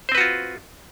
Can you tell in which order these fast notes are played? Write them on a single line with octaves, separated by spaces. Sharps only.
C5 C4 B4 F#4 F4